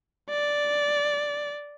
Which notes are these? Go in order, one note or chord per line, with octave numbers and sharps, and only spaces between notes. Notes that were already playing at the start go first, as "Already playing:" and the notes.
D5